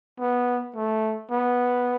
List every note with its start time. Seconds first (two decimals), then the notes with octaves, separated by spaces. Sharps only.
0.20 B3
0.76 A3
1.31 B3